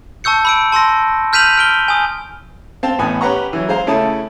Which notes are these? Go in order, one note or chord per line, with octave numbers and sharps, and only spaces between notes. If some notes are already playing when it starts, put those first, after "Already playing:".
A5 C#6 E6 G6 C#7
B5 E6 D7
A5 C6 E6 A#6
F6 G6 B6 D#7 F7 F#7
F6 D7 G7
G#5 D#6
C4 F5 G5 A5
A1 A2 B3 G#5 D#6
C#4 G4 B4 F#5 A#5 C#6
E3 F#3
G#3 C5 F5 A#5
C#3 A3 C#4 E4 A5 D#6